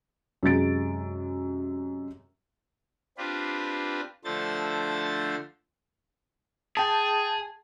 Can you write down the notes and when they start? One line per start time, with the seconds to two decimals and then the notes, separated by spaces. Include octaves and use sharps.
0.43 F#2 C3 G#3 A6 D7
3.18 C4 D4 F4 G4 B4
4.24 D3 F3 A3 C5 A6
6.77 G#4 G5 A5